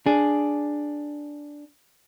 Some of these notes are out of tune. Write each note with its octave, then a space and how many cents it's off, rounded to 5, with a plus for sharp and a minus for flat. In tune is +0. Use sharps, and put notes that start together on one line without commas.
D4 +0 G#4 +0